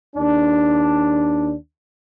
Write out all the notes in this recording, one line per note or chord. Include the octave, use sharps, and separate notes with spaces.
D#2 D4